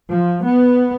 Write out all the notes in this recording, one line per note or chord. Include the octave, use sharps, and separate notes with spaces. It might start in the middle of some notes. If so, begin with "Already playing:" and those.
F3
B3